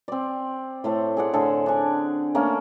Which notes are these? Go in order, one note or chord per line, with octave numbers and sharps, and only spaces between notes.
C4 D5
A2 A3 C5
G#4 D5 F#5
A2 D3 G#4 A4
D4 G#5
A3 A#3 C#4